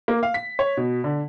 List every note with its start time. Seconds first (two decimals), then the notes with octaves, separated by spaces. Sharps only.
0.08 A#3
0.23 F5
0.34 B6
0.59 C#5
0.77 B2
1.04 D3